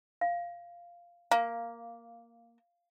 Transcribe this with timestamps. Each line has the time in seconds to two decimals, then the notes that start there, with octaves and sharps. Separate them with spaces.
0.21 F5
1.31 A#3 F5